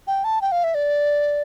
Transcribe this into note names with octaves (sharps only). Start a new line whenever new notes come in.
G5
A5
G5
F5
E5
D5